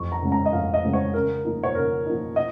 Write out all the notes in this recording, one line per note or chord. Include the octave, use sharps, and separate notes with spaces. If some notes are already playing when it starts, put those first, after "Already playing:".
Already playing: F2 C#6
A#5
C#3 G#3 C#4
A#5
D#5
F2 F5
D#5
C#3 G#3 C#4
C#5
C#3 A#4
F3 A#3 D#4
C#5
C#3 A#4
F3 A#3 D#4
D#5